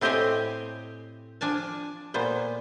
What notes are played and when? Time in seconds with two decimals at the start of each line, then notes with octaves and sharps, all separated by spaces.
0.01 A2 C4 G4 C5 D#5 G#5
1.41 F3 D4 G#5 A5
2.14 A#2 B3 C5